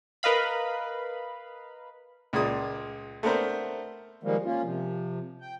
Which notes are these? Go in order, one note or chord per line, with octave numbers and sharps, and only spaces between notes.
A#4 B4 D#5 F5 B5
C#2 A#2 G#3 D#6
A3 B3 C4 D4 A#4 C5
D#3 F3 G3 G#3 A#3
A#3 C#4 F4
C3 F3
G5